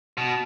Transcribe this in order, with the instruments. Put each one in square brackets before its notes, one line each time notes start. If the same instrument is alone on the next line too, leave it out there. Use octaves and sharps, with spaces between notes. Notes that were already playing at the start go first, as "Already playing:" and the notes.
[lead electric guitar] B2